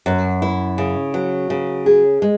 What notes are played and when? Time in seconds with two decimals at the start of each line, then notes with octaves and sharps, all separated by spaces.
0.06 F#2
0.42 E4
0.78 C#3
1.14 F#3
1.50 C#3
1.86 G#4
2.22 G#3